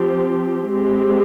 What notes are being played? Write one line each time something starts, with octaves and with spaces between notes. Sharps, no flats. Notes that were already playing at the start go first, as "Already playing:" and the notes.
Already playing: F3 C4 G4
G#3 C4 G4